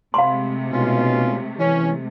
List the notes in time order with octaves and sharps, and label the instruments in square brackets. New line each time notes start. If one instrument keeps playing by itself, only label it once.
[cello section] C3 G#3 A3 [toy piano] F5 B5 C6
[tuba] B2 [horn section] C#4 D#4 F4
[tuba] E3 [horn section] C#4